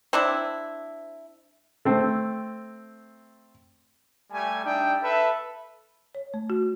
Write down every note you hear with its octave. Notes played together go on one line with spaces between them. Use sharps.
C4 D4 E4
A3 C4
G3 A3 G#5
G3 D4 D#4 E5 G5
A4 B4 E5
C#5
A3
F#4